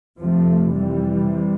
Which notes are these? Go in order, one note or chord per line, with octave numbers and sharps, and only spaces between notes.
F1 F2 C3 F3 A3
E3 G3
C3